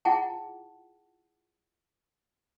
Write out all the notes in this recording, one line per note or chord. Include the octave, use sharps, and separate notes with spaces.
E4 F4 G#4 F#5 G5 A5